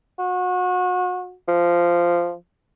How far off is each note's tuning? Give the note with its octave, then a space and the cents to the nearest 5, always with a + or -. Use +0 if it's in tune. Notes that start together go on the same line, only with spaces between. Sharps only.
F#4 -30
F3 -10